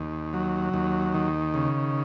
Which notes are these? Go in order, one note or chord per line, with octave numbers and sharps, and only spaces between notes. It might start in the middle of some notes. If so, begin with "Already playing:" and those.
Already playing: D#2
F#3
D#2
D#3
C#3